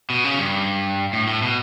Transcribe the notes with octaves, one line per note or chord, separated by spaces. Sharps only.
B2
C#3
G2
A2
A2
B2